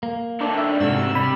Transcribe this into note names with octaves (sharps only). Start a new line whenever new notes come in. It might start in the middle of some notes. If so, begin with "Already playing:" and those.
A#3
A3 C4 D4 D#4
E5
G#2 C3 A#3 D4 F#4 E6
C3 G3 B5